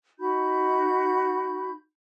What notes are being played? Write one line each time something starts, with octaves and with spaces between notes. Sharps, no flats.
D#4 F#4 B5 G6